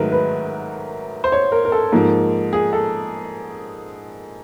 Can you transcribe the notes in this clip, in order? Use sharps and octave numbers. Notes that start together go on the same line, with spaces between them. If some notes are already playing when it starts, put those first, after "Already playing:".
Already playing: G#2 D#3 F#3 A3 A#4 B4
B4
C5
C#5
A#4
A#4
A4
G#2 F3 A#3
G#4
A4